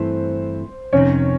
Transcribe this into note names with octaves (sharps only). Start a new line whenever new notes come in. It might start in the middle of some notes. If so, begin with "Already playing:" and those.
Already playing: G2 E3 A3 C4 E4 C5
F2 C3 D#3 C#4 C#5